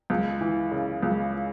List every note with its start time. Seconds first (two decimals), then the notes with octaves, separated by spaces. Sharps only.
0.10 C#2
0.41 E3
0.71 C#3
1.03 C#2